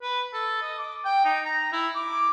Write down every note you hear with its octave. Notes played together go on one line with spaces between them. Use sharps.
B4
A4
D#5
D6
G5
D#4
A#5
E4
D6